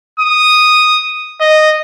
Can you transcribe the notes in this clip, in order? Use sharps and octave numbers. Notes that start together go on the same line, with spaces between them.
D#6
D#5